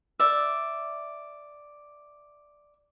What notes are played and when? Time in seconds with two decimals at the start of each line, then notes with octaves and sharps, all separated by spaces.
0.20 D5 E5